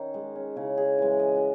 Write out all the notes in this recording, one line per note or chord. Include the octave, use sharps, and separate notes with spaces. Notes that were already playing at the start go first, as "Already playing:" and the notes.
Already playing: D#3 C#4 D#4
G#3
C#4
C#3 E4
G#4
E3 G#3
D#5
F#4